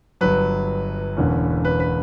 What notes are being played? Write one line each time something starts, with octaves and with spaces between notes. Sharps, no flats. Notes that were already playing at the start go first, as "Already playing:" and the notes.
G1 G2 F#3 B4
E1 E2 D3 A#3 C#4
B4
B4